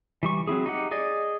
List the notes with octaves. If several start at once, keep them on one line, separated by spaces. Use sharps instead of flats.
E3 G3 C#6
F#3 C4 E4 G#4
D#4 G4 F#5
G#4 D5 D#5